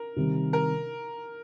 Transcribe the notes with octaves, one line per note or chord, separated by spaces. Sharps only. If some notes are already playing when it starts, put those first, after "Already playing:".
Already playing: A#4
C3 D#3 G3
A#4